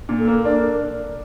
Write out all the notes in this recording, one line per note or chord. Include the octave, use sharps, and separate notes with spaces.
A#2
A4
A#3
D4 A#4